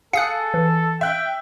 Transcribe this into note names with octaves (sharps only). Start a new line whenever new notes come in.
G#4 A4 F5 D#6 F#6 C#7
E3
E5 G5 F#6